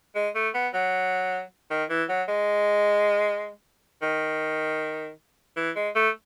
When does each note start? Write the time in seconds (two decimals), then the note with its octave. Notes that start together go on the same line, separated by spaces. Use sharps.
0.16 G#3
0.35 A3
0.54 B3
0.74 F#3
1.71 D#3
1.90 E3
2.09 F#3
2.28 G#3
4.02 D#3
5.57 E3
5.76 G#3
5.96 A3